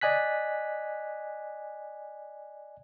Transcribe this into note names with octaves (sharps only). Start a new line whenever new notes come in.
D5 D#5 G#5 F#6 B6